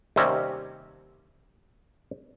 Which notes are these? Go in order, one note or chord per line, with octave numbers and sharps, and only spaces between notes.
D#2 C3 G3 C4 C#4